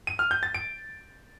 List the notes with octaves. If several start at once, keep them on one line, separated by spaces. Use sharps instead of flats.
D#7
F6
G6
A6
D7